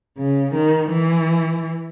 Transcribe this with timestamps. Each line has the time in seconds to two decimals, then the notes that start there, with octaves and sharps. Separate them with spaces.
0.18 C#3
0.54 D#3
0.90 E3